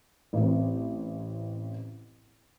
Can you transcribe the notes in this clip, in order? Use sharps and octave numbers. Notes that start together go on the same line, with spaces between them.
A1 C4